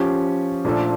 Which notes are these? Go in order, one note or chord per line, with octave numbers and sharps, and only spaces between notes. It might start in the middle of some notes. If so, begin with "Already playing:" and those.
Already playing: F3 C#4 G4
A#2 F3 A3 D4 A4